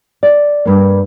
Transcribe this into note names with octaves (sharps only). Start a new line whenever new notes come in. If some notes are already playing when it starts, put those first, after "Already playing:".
D5
G2 A#3